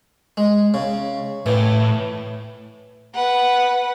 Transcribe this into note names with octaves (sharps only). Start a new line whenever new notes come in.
G#3
C#3
A2 E3
B4 F#5